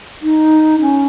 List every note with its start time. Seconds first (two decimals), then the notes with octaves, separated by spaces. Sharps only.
0.22 D#4
0.81 C#4